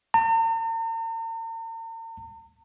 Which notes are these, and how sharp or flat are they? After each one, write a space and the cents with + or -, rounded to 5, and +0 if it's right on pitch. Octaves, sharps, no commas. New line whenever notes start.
A#5 -45